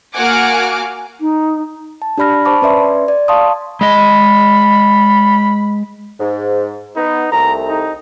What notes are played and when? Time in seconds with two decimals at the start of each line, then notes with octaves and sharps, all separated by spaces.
0.15 A#3 F#4 F#5 G#5 D6 F6
1.19 D#4
2.02 A5
2.18 D4 G4 D5 B5 F6 A#6
2.45 C5 A5 B5 C#6 D6
2.62 C#4 B4 D5 E5 C6
3.08 D5
3.28 F5 A5 C6 C#6 D#6
3.81 G#3 D#5 B5
6.20 G#2
6.96 B3 D#4
7.32 C2 A3 A#5
7.67 D#4